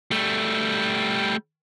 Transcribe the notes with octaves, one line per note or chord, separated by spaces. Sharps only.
G3 A3